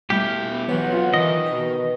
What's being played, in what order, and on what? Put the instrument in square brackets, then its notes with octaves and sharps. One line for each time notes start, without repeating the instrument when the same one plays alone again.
[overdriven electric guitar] B2 E4 [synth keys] G3 A3 F6 [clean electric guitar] G4
[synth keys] B3
[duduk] E3 [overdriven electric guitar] F#3 B3 [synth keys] C#5 F#5
[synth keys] C4 F#5 [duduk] F4
[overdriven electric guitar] D#3 [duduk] E3 [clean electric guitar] D#5
[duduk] B2 [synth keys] B4